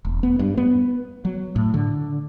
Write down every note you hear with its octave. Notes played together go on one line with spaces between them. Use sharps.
E1
B3
G2
B3
F#3
A2
D3